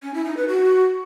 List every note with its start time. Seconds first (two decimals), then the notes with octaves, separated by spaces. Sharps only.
0.03 C#4
0.14 E4
0.25 D#4
0.37 B4
0.48 F#4